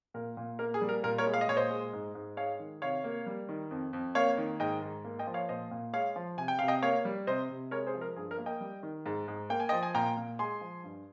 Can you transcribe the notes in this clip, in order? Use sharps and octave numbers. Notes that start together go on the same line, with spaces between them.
A#2 A#4
A#2
A#3 A#4
G#4
G3
A#4
A#2 A#4
A#4 C#5
G#3
F5
D#5
A#2 C#5
C5 D#5
G#3
G#2
G#2
G#3 C#5 F5
D#3
C3 C#5 F5
A#3
G3
D#3
F2
F2
A#3 C#5 F5
D#3
G#2 D#5 G5
G#2
A#3
D#5 G5
F3
C#5 F5
A#2 C5 D#5
A#2
G#3 C#5 F5
F3
C3 G#5
G5
C3 F5
D#5 G5
A#3 C#5 F5
G3
C3 C5 D#5
C3
G#3 A#4 C#5
G#4 C5
F3
A#4
G2 G#4
A#4
A#3
D#5 G5
G3
D#3
G#2
G#2
A#3 G5
G#5
D#5 G5
F3
G#5
A#2 G5 A#5
A#2
G#3 G#5 C6
F3
G2